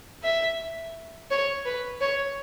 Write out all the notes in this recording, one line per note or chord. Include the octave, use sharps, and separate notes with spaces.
E5
C#5
B4
C#5